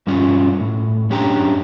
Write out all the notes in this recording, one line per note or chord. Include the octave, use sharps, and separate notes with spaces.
G2 G3 C#4 F4
A2
F#2 C#4 D4 G4 G5 A#5